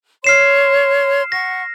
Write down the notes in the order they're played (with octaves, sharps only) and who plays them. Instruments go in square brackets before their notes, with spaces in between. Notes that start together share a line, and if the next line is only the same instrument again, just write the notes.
[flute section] C#5 C6 [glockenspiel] F6 C7 E7
[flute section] F#5 C#6 [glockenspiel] A#6